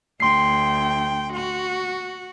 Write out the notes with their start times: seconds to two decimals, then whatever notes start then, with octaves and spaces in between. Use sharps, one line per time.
0.20 D2 G5 C6 C7
1.33 F#4